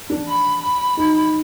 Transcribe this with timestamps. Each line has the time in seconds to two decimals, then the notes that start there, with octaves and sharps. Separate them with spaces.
0.10 D4
0.28 B5
0.61 B5
0.97 D#4